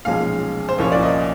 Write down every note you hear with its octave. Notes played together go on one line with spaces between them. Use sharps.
B1 A#2 F3 G#3 C#4 F5
C5
C2 A#2 F3 A#3 C#4 C#5
D5
D#5